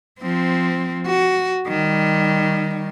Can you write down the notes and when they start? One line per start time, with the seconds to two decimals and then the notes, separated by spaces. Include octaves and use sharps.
0.21 F3 C4
1.06 F#4
1.68 D#3 G3